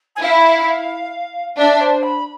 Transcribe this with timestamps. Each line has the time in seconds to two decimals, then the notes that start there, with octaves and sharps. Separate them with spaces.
0.15 G#5
0.22 E4 F5
1.57 D4 E5
1.80 C5
2.03 B5